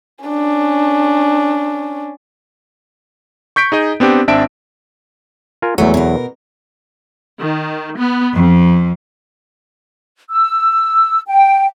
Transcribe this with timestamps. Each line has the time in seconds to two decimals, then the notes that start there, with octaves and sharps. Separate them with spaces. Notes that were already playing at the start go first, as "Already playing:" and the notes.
0.25 C#4 D4
3.56 C#6 G6 B6 D7
3.72 D#4 G#4 D#5
4.00 B3 C4 D4 G4
4.28 G#1 C4 D4 E5 A5 D7
5.62 F4 A#4 G#5
5.78 E2 F#3 A3
5.94 B2 A#4
7.40 D#3
7.98 B3
8.36 F2
10.31 E6
11.28 G5